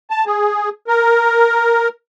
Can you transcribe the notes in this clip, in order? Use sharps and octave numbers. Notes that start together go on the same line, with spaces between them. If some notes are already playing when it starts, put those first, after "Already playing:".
A5
G#4
A#4